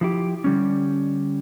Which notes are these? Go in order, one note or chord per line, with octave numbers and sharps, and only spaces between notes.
F3 E4 G4
D3 G3 C#4